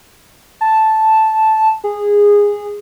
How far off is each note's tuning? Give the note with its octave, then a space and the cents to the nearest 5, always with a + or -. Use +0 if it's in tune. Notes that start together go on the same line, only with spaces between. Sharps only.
A5 -5
G#4 -15